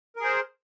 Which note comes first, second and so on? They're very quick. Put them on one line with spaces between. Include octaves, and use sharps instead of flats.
A#4 G#4 C5